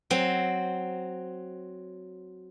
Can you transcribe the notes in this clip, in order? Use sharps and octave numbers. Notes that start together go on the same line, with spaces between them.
F#3 C4